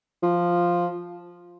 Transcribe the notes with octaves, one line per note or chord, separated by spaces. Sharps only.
F3